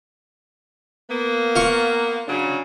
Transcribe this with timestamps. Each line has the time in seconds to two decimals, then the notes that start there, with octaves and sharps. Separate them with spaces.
1.09 A#3 B3
1.56 F4 C#6
2.28 C#3 F#3 D4